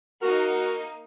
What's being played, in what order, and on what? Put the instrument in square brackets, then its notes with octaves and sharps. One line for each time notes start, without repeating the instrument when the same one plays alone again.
[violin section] A#3 D#4 [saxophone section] F#4 [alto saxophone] A#4